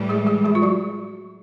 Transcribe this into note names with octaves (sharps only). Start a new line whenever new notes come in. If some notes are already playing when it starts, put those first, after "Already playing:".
Already playing: A2 E3 G3
G#3 G#4
G#3 G#4
G#3 G#4
F4
F#3 F#4